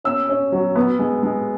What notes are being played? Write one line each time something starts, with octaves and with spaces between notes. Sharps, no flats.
C#4 E6
C#4
F#3
B3
G#3
G#3